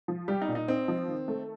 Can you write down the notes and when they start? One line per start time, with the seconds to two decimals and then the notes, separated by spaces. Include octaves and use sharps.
0.08 F3
0.28 G3 G4
0.42 D#4
0.48 A#2
0.55 D#4
0.68 C4 D#4
0.88 F3
1.08 D#3
1.28 A3